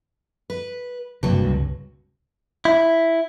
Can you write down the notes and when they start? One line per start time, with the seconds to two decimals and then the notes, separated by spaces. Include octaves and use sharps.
0.50 B4
1.23 F#1 G2 C3 F#3 A#3
1.45 C#2 C3 G#3
2.65 E4